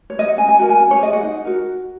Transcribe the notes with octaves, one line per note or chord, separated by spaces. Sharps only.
C#5
D#5
F#5
C#4 G#5
G#5
F#4 A#4 G#5
G#5
C#4
C#5
G#4 D#5
F#5
D#4
F#4 A#4